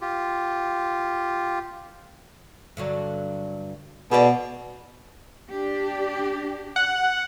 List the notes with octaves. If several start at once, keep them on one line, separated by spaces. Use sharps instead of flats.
F4 G4
G2 D3 F#3
B2 G#4 D5
D4 G4
F#5